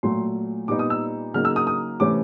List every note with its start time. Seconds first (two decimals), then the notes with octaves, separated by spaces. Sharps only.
0.03 A#2 F#3 A3 C6
0.68 A#2 G3 B3 D#4 D6
0.79 D#6
0.90 E6
1.34 C#3 F#3 A#3 D#4 F6
1.45 E6
1.56 D#6
1.67 D#6
2.00 C3 E3 A3 C#4 D6